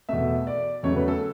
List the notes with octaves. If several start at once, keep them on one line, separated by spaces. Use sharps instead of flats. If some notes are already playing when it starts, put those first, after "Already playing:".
E2 B2 A3 E5
D5
E2 C#3 F#3 A3 C#5
B4
A4